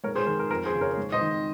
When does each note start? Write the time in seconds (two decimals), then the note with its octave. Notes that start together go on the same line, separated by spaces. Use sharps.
0.04 G#2 A#4 C#5
0.15 G#4 C5
0.26 D#3 A#4
0.39 A#4
0.51 F2 A#4
0.66 G#4 C5
0.75 C#3
0.81 A#4 C#5
0.97 G#2
1.12 C5 D#5
1.21 D#3